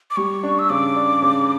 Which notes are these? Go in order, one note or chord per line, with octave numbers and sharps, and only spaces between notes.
D6
G3 C#6
D4
E6
C#3 D6
D4
C#3